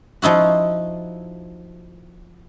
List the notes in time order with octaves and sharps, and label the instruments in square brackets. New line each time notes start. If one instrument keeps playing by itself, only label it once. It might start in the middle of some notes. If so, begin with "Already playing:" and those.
[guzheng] F3 D#4 E4 F#4